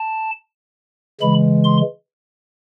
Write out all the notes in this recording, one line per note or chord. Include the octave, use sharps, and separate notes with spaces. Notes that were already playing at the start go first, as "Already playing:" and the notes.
Already playing: A5
C#3 E3 G#3 B5
C6